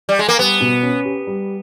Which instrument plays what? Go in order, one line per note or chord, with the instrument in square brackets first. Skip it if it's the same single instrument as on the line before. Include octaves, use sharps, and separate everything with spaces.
[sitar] G3
G#3
A#3
[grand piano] G3 [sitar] B3
[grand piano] B2
C#4
G4
G3